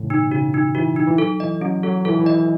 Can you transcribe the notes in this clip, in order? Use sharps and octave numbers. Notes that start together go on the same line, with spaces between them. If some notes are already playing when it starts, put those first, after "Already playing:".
Already playing: A2 C#3 E3
B2 D#4
C#3 F#4
D#4
E3 F#4
D#4
E3
F#3 A4
E3 D#5
F#3 C#4
F#3 A4
E3 A4
D#3
E3
D#5